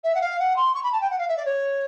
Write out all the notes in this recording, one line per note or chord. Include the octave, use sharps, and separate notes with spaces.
E5
F#5
F5
F#5
C6
C#6
B5
A5
G5
F#5
F5
E5
D5
C#5